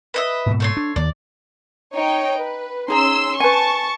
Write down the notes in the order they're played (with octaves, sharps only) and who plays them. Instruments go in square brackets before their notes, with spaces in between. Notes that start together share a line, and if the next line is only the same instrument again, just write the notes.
[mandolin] B4 D#5 E5
[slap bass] G#2 B2
[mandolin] A3 C#5 C6
[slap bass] D4
[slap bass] D#2 D#3 [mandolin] D5
[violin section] D#4 C#5 G5
B4
[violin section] C#4 C6 E6 [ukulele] D#4 G#4 A#5
[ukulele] B4 G#5 [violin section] A5 C#6